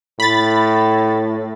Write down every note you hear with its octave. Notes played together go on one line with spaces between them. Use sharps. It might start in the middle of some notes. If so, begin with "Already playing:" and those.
A2 B5 A6